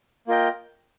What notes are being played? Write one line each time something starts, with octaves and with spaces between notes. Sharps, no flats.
A#3 F4 A#4 D#5 G5